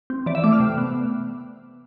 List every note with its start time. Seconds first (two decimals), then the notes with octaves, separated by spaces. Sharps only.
0.10 C4
0.26 E3 D5
0.35 E5
0.44 A3 D6
0.52 F6
0.60 C3
0.78 B3